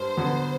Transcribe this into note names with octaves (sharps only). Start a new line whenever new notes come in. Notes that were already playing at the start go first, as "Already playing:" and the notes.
Already playing: G2 C5
D3 F#3 B3